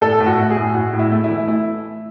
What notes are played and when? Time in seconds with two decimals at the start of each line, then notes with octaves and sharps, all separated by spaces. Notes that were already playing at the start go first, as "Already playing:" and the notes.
0.01 A2 A4
0.20 A2
0.26 F#4
0.38 A3
0.50 G#4
0.57 A2
0.74 A2 F#4
0.93 A2
0.99 E4
1.11 A3
1.24 E4
1.30 E3
1.47 A3 E4